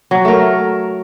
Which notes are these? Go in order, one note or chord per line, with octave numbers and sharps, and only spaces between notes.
F#3
A3 A#4